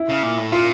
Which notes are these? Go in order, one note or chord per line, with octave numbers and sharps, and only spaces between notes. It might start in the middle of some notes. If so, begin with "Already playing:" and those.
Already playing: E4
C#3
A#2
A2
A#2 F4